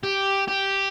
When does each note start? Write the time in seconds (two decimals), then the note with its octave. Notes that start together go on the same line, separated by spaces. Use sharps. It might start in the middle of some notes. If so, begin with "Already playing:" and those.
0.03 G4
0.48 G4